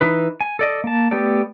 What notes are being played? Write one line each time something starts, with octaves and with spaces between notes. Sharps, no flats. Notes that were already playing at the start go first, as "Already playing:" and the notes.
E3 D#4 B4
G#5
A4 D5 D#5
A#3 A5
A3 B3 G4 A4 D5